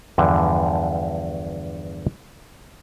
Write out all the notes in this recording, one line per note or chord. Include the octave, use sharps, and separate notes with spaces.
E2 G2 D3 F3